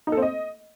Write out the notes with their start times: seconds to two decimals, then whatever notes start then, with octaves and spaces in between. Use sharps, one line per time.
0.07 D#4
0.12 A4
0.17 C4
0.22 D#5